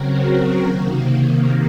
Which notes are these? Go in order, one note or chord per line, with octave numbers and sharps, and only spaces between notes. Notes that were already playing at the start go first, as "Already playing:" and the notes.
Already playing: C#3 F#3 C4 F#4 A#4
C3 D#3 A#3